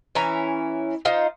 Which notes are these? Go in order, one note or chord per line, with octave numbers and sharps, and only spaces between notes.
E3 C#4 E4 A#5
D#4 F4 C5